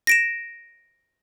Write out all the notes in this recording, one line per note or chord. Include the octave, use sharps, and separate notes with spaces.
A#6 D7 E7